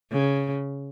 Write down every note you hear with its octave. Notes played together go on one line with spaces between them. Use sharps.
C#3